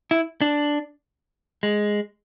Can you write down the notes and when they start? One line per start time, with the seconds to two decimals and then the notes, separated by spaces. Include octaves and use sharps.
0.11 E4
0.41 D4
1.63 G#3